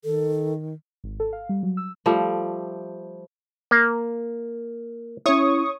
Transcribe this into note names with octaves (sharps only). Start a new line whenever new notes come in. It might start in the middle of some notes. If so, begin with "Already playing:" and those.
D#3 A4
G#1
A4
F5
G3
F#3
E6
F3 G3 A3
A#3
C#4 E4 C#5 C#6 D#6